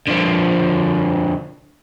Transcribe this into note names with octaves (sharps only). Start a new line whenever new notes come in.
D3 F3